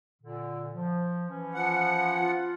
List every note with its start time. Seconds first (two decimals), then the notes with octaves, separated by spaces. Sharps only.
0.22 A#2 D3
0.73 F3
1.30 E3 C#4
1.54 F3 F#5
2.20 F4